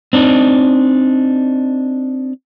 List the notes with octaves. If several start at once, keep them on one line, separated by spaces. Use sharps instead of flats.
C4 D4 D#4